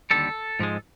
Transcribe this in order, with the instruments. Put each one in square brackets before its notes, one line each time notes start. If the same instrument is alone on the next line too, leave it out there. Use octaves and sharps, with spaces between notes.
[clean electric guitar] D#2 D3 G3 A4
G#2 F3 G#3